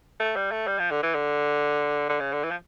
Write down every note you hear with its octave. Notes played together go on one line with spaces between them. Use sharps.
A3
G3
A3
G3
F3
D3
E3
D3
D3
C#3
D3
E3
F3